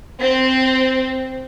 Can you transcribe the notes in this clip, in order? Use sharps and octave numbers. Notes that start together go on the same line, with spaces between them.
C4